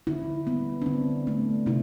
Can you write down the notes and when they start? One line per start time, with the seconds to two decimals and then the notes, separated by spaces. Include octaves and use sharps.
0.07 D3 E4
0.46 G3 B3
0.82 D4
0.86 D3 C4
1.27 A3 D4
1.66 C3 E4